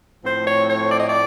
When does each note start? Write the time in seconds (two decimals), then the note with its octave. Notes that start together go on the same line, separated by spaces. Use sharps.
0.23 A2 F3 A3 C4 C5
0.46 C#5
0.68 C#5
0.91 D5
1.00 D#5
1.08 D5